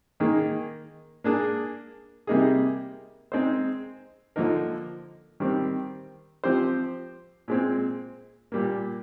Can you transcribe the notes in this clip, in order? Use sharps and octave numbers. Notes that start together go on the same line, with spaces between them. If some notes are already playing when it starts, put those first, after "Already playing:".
D#3 A#3 D#4 G#4
A#3 D4 G#4
C3 G3 A#3 D#4 G#4
G#3 C4 D#4 G#4 C5
D3 F3 A#3 D#4 A#4
D#3 G3 C4
F3 C4 G4 C5
A#2 G#3 C4
A#2 G3 A#3